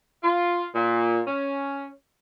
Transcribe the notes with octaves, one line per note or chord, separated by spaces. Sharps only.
F4
A#2
C#4